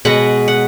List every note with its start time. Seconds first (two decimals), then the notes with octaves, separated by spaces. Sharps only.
0.05 B2 G#3 B3 F#5
0.48 F#5